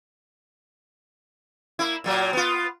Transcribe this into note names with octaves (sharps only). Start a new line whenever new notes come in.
A#3 E4
A#2 F#3 A#3
B3 F4